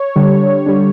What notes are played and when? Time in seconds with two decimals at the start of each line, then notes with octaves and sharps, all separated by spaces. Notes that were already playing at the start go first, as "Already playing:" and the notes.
Already playing: C#5
0.16 D3 G3
0.66 D3 G3